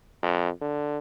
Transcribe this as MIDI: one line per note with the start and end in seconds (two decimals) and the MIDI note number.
0.23 0.50 41
0.61 0.99 50